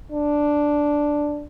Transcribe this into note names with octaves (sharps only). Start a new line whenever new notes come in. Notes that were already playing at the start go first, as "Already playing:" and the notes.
D4